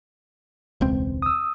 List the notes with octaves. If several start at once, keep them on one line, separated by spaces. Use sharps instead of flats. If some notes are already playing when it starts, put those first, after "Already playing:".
E1 C#2 C4
D#6 E6